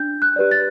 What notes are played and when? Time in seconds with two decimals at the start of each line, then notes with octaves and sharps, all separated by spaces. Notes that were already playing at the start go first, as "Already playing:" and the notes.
Already playing: D4 G6
0.22 F#6
0.36 G4 B4 D5
0.51 A6